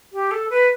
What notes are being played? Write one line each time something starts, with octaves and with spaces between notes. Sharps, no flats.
G4
A4
B4